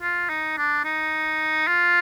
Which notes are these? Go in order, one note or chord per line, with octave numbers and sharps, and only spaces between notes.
F4
D#4
D4
D#4
F4